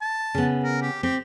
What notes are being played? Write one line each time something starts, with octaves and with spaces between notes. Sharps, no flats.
A5
C#3 B3
A#4
G4
C4 G4